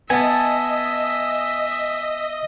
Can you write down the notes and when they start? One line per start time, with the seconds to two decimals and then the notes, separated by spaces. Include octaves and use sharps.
0.10 B3 D#5 E5 G#5 A5